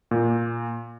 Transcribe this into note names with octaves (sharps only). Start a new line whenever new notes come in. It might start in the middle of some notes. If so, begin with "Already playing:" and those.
A#2